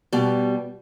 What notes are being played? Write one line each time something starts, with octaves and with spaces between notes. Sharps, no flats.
B2 G3